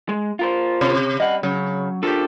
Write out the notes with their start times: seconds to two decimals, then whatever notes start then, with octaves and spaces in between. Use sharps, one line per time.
0.09 G#3
0.39 F4 A#4 C5
0.81 C3
1.20 G3 D#5 F#5
1.43 C#3 F#3
2.03 D4 F4 G4 A4 A#4